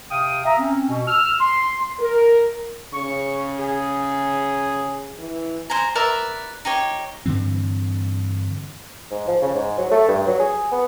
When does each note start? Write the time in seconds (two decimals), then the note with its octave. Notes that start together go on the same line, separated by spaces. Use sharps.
0.11 C3 F5 G5 D#6
0.45 E5 A#5
0.59 C4 C#4
0.89 B2
1.08 E6 F6
1.41 C6
1.99 A#4
2.93 C#3 C#6
3.60 G#4
5.19 E3
5.70 C5 G#5 A#5
5.95 A#4 B4 D5 E5
6.65 D#4 G4 C#5
7.26 G2 D3 E3 C4
9.11 G#2
9.28 F3
9.42 C#3
9.55 G#2
9.78 F#3
9.92 A3
10.08 G2
10.27 F#3
10.40 G#4
10.72 B3